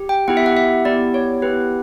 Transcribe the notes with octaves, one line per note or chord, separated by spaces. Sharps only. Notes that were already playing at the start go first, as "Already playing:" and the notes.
Already playing: G4
G5
B3 E4 G4 F#5
E5
F#5
E5
B3 E4 G4 D5
C#5
B3 E4 G4 B4